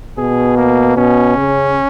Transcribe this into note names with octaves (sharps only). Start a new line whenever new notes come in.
B2 G#4
A#3
B2 C#4
C#3